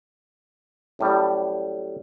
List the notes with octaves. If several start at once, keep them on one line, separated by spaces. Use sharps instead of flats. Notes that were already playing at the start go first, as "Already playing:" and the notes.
F#2 A2 G3